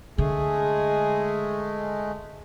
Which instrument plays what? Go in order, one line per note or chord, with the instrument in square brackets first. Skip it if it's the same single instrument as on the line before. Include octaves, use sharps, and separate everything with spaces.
[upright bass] D3 [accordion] G#3 A3 [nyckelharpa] G#4